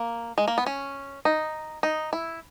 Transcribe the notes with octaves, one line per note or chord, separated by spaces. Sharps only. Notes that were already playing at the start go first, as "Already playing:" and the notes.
Already playing: A#3
G#3
A#3
B3
C#4
D#4
D#4
E4